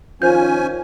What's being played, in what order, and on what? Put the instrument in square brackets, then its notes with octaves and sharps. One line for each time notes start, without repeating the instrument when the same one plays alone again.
[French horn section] D#3 F3 F4 [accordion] C#4 G#5 [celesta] C5 G6